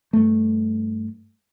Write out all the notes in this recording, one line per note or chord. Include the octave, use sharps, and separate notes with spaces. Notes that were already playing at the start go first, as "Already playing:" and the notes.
G2 A3